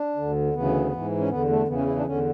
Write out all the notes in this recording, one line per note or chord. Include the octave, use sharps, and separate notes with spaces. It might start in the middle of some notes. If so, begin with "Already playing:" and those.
Already playing: D4
D2 D3
D2 C#3 E3 B3
G#2 E3
C#4
E2 D3 B3
A3
E2 C#3 E3 B3
C#4
E4
D4
E2 D3 C#4